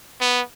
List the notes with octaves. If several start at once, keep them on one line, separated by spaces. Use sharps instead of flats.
B3